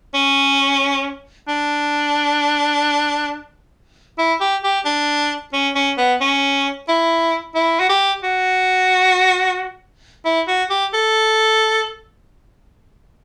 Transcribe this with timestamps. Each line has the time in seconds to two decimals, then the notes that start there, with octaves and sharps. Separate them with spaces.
0.14 C#4
1.48 D4
4.18 E4
4.41 G4
4.64 G4
4.85 D4
5.53 C#4
5.75 C#4
5.98 B3
6.21 C#4
6.89 E4
7.55 E4
7.80 F#4
7.89 G4
8.23 F#4
10.25 E4
10.48 F#4
10.70 G4
10.94 A4